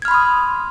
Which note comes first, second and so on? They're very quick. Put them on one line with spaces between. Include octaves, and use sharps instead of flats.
G#6 F6 B5 C6 D#6